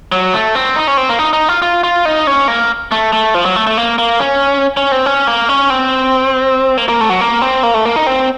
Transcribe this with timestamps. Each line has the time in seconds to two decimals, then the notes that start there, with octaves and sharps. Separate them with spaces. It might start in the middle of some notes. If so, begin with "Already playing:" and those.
0.12 F#3
0.34 A3
0.55 C4
0.76 D#4
0.87 C#4
0.97 C4
1.09 A#3
1.19 D#4
1.33 D#4
1.49 F4
1.62 F4
1.84 F4
2.05 D#4
2.27 C#4
2.48 A#3
2.92 A3
3.13 A3
3.35 F3
3.46 F#3
3.56 A3
3.67 A3
3.77 A#3
3.98 A#3
4.20 C#4
4.77 C#4
4.92 C4
5.06 C#4
5.27 A#3
5.49 C#4
5.70 C4
6.77 A#3
6.89 A#3
7.01 A3
7.10 F#3
7.21 A#3
7.42 C4
7.63 A#3
7.74 A3
7.85 A#3
7.96 D#4
8.07 C4